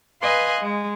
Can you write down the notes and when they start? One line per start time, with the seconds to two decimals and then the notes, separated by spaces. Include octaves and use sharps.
0.22 B4 D#5 F5 G#5 C6 F#6
0.60 G#3